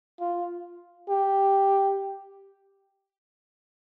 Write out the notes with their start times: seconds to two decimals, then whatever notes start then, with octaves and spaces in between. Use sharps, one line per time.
0.21 F4
1.09 G4